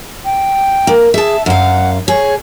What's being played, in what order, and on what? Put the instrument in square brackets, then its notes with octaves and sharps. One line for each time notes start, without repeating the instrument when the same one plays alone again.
[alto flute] G5
[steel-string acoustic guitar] A#3
[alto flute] G#4 [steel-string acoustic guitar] E5 A5
[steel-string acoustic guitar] F#2 F5 [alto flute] F#5
[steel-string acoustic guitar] G#4 [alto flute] C#5